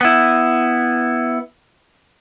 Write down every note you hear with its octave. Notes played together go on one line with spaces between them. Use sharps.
B3 E4